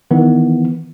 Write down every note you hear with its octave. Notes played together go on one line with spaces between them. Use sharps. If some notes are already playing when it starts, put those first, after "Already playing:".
D#3 E3 B3